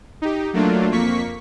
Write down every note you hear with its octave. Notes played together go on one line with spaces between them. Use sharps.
D#4 G4
F#3 A3 A#3 D4 F4
F2 A#3 C#6 B6